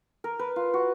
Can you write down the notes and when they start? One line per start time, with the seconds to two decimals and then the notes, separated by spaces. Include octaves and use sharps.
0.24 A#4
0.39 B4
0.56 F4
0.74 F#4